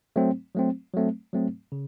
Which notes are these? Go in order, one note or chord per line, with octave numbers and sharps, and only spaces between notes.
F#3 A3 C4
F#3 A3 C4
F#3 A3 C4
F#3 A3 C4
C#3